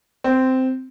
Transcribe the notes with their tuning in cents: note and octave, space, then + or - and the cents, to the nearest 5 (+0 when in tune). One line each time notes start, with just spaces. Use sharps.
C4 -10